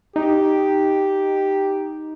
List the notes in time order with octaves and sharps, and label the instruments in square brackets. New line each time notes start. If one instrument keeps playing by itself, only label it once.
[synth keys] D#4 [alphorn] G4